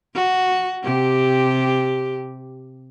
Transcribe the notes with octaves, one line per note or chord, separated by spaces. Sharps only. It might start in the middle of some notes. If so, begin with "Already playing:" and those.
F#4
C3 G4